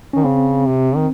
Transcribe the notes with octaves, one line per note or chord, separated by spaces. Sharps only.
D#3 C#4
C#3 C4
C3
D#3